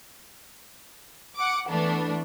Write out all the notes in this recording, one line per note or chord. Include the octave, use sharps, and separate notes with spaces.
F#5 D6
E3 A3 B3 D4